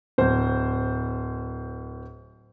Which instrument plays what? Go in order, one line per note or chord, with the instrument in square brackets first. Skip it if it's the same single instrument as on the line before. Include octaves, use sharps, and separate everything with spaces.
[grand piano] D1 C5